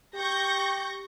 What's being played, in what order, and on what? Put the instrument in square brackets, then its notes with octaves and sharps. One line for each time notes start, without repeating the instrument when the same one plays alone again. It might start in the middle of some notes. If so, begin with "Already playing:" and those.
[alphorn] G4 [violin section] C#6 G6 A#6